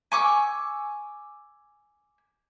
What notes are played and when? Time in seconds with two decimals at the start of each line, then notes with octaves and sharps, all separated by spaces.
0.12 G#5 C#6 D6 E6